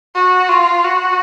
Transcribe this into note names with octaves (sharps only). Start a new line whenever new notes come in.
F#4
F4
F#4